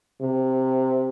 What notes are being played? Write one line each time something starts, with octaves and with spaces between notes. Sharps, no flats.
C3